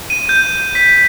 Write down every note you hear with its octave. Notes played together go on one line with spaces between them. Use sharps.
D#7
G6
B6